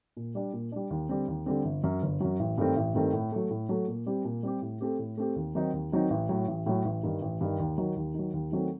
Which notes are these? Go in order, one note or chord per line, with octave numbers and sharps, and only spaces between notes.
A#2
G3 D4
A#2
G3 D4
D#2
D3 G3 C4
D#2
D3 G3 C4
G1
F#2 F#3
G1
F#2 F#3
A1
G2 D#3 A3 C4
A1
G2 D#3 A3 C4
A2
F#3 A3
A2
F#3 A3
A#2
G3 C4 G4
A#2
G3 C4 G4
A2
A3 C4 G4
A2
A3 C4 G4
D#2
D#3 F#3 C4 D#4
D#2
D#3 F#3 C4 D#4
A1
A2 F#3
A1
A2 F#3
A1
G2 D#3
A1
G2 D#3
D#2
D#3 F#3
D#2
D#3 F#3
D#2
D#3 F#3 A3 C4